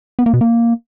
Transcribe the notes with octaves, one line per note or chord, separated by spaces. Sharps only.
B3
A#3
B2
A#3